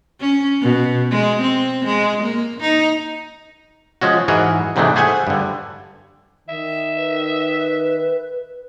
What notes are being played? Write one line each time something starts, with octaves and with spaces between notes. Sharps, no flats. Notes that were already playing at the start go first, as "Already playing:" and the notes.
C#4
B2
G#3
C4
G#3
A#3
D#4
F3 G#3 C#4 F#4
G#2 E3 F#4 G#4 A#4 D#5
G#2 C3 E3 G#3 A3 D4
A3 G#4 C5 E5 F#5 G#5
G2 D3
D#3 E5
B4